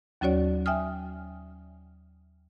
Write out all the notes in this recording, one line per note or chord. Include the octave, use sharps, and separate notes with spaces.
D#2 F#3 C#4 F#4 C#5 D5
E5 G5 G#5 D#6 F6